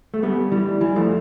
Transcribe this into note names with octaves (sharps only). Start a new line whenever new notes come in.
A3
G3 B3
E3 G3
E3 G3
F3 A3